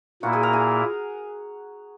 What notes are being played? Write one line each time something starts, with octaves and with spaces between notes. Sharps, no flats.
A#2 A#3 E4 F#4 F#5
G#4 G#5
A#4 A#5
G#4 G#5